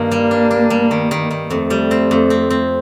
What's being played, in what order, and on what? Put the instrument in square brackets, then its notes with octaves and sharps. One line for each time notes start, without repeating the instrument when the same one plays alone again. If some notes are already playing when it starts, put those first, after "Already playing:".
Already playing: [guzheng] G2 D#3 [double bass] A#3
[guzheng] G3
D4
D4
G3
D#3
D#3
D#3
[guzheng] F2 [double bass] A3
[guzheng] G3
C4
F2
C4
C4